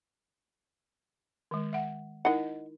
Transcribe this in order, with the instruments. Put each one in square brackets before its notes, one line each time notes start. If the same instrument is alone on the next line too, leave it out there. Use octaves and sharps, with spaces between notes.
[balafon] D#3 G#3
E5 F#5
[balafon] D#4 E4 A#4 [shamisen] D#5 F#5